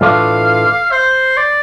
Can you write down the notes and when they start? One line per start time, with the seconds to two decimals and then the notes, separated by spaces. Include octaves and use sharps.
0.01 A2 E3 A3 D4 F4 F5
0.91 C5
1.37 D5